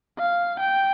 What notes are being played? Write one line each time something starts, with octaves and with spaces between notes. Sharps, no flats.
F5
G5